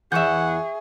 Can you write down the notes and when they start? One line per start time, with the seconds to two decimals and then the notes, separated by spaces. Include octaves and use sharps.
0.12 E2 E3 G#4 E5 F#5 C#6 G6